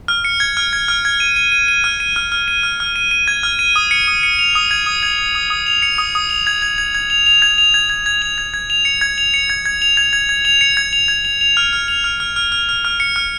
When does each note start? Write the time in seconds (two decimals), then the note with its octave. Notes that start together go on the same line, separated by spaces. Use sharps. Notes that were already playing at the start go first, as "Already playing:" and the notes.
0.08 F6
0.24 C#7
0.40 G#6
0.57 F6
0.73 G#6
0.88 F6
1.05 G#6
1.20 D#7
1.36 D#7
1.52 D#7
1.68 D#7
1.84 F6
2.00 D#7
2.16 F6
2.32 F6
2.48 D#7
2.63 F6
2.80 F6
2.96 D#7
3.11 D#7
3.28 G#6
3.43 F6
3.59 D#7
3.76 D#6
3.91 C#7
4.07 D#6
4.23 C#7
4.39 F7
4.55 D#6
4.71 G#6
4.86 D#6
5.03 G#6
5.19 D#6
5.35 D#6
5.50 D#6
5.66 F7
5.82 C#7
5.98 D#6
6.15 D#6
6.30 F7
6.47 G#6
6.62 G#6
6.78 G#6
6.95 G#6
7.10 F7
7.26 F7
7.42 G#6
7.58 F7
7.74 G#6
7.90 G#6
8.06 G#6
8.22 F7
8.38 G#6
8.54 G#6
8.70 F7
8.85 C#7
9.01 G#6
9.18 F7
9.34 C#7
9.50 G#6
9.66 G#6
9.82 F7
9.97 G#6
10.13 G#6
10.29 G#6
10.45 F7
10.61 C#7
10.77 G#6
10.93 F7
11.08 G#6
11.25 F7
11.41 F7
11.57 F6
11.73 F6
11.88 F7
12.04 F6
12.20 F6
12.36 F6
12.52 F6
12.69 F6
12.85 F6
13.00 C#7
13.16 F6